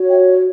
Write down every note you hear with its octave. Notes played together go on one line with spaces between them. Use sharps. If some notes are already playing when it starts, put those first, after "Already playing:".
Already playing: F#4 C#5
E5 G5
D5